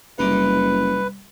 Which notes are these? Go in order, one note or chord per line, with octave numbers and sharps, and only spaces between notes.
F#1 C2 D#4 B4 D6